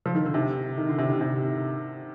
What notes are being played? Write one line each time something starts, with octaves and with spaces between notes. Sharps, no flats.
F3
D#3
D3
C3
D#3
D3
C3
D3
C3